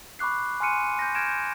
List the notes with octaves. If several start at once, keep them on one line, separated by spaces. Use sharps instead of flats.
B5 C#6 D6 F#6 C7
G#5 C6 F6 F#6 C#7 D#7
G6 A#6
F6 G6 G#6 A#6 D7 E7
G6